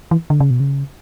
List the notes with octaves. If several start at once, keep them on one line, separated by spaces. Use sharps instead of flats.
E3
D3
C#3
B2
C#3